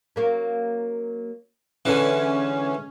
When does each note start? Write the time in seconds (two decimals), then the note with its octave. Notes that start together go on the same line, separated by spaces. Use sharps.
0.16 F#3 A#3 C#4
1.85 D3 E3 G#3 C#4 A4